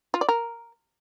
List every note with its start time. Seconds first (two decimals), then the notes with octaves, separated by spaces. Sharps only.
0.14 F4
0.21 D5
0.29 A#4